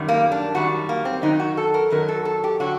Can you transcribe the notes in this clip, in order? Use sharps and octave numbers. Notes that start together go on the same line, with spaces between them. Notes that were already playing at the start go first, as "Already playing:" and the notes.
Already playing: F#2 D#3 G3
A#3
D4
F#2 D#3 G3 F#4
A#3
C4
F#2 D#3 F#3 D#4
F#4
A4
A#4
F#2 D#3 F#3 A#4
A4
A4
G4
D3 F#3 F#4